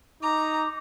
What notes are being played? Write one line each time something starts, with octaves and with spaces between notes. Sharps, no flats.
D#4 A#5 D6